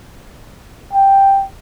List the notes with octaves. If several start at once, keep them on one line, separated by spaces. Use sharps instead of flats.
G5